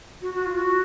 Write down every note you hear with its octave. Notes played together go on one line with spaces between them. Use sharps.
F#4
F#4
F4
F#4